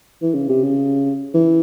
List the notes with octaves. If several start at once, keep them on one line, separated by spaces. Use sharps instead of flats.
E3
C#3
C3
C#3
E3